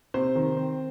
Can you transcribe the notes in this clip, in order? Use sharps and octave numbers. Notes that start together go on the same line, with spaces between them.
C3 C5
D#3
C4